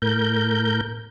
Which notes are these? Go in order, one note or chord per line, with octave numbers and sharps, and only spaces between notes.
A2 A#4 G6